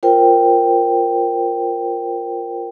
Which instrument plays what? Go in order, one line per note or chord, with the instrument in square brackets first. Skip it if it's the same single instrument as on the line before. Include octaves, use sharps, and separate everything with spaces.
[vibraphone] F4 A#4 C5 G5